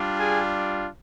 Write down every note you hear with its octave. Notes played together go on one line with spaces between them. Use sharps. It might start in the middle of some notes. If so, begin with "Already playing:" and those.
Already playing: G3 D4 F4
G#4 G#5